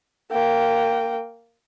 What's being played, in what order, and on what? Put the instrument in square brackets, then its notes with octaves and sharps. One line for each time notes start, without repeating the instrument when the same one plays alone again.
[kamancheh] A#3 G5